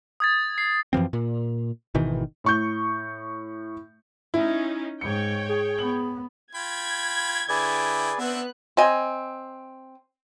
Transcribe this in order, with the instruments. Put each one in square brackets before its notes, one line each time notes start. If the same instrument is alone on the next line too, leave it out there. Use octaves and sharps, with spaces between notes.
[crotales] D#6 G#6 A6
C7
[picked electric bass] F#2 E3 F3 C4
A#2
G#1 B2 D#3 E3
[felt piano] A2 C#6 G6
[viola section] C#4 D#4 [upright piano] E4
[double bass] G#2 [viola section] C#5 G5 [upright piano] C#7
[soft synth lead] G#4
[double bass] B3 [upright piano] F#7
[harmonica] F4 G5 B5 [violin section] G#6
[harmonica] D3 E4 G5 [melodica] G#4 B4 D5
[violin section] B3 F#6 [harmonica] C4 D4 E5
[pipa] C4 D#5 G#5